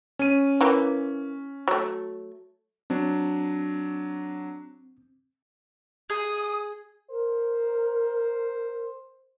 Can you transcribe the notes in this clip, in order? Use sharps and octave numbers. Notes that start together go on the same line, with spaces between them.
C#4 D#7
E3 A#3
F#3 A3
F#3 C4 D4
G#4 D#6
A#4 C5